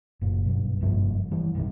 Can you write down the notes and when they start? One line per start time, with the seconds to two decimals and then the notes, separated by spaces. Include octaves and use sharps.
0.21 F#1 A#2
0.45 B1 G2
0.81 F#1 G2 F3 A#3
1.31 E3 G3
1.55 F1 A#1 D#3 G3